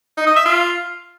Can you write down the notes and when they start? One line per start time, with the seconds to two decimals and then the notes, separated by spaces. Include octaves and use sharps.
0.18 D#4
0.27 D#5
0.36 E5
0.46 F4